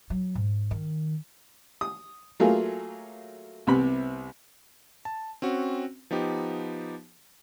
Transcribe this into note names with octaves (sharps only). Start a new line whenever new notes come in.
F#3
G#2
D#3
D#6
F#3 A3 A#3 F4 G#4
C2 C3 B3 B5
A5
C4 C#4 F#4
F3 B3 D#4 G4